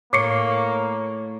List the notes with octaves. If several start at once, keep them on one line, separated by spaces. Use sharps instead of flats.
A2 A#3 C#5 C#6 D6 C7 C#7